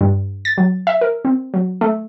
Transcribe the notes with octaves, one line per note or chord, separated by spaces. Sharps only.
G2
A6
F#3
E5
A#4
C4
F#3
A3